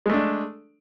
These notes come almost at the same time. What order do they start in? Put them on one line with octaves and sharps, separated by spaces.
G#3 A3 D4